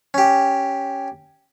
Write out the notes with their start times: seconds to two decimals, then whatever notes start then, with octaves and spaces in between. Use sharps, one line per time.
0.14 C#4 G4